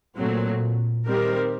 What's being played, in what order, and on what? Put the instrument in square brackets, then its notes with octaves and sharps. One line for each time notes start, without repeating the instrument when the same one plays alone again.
[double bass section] A#2 [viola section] F#3 A3 C4
[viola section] D#3 G3 C4 G4 A#4